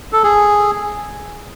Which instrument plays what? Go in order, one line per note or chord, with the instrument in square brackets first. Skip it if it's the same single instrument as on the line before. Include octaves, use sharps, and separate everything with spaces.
[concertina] A4
G#4